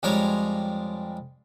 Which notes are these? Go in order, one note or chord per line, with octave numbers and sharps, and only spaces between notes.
F2 G3 G#3 A#4 C#5 A#5